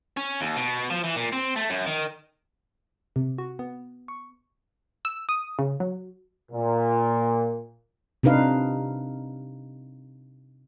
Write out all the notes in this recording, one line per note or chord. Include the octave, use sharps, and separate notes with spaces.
C#4
D#2
B2
F3
E3
A#2
C4
A3
F#2
D#3
C3
F#4
B3
C#6
E6
D#6
C#3
F#3
A#2
C3 D4 D#4 B4 F5